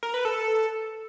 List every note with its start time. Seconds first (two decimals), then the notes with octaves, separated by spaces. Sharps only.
0.03 A#4
0.14 B4
0.25 A4